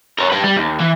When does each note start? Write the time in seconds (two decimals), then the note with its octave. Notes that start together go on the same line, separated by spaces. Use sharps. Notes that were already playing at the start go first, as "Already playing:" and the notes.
0.19 A#4 C#5
0.30 G4 B4
0.44 G3
0.57 D#2
0.80 E3